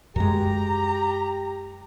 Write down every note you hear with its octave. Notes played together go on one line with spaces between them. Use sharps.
F#2 G#3 G4 A#5